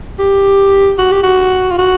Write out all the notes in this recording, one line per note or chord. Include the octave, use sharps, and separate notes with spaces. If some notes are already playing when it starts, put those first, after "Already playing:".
G4
F#4
G4
F#4
F4
F#4